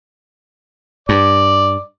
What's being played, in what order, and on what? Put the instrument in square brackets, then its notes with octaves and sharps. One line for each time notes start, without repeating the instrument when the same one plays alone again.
[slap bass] G2 [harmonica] D5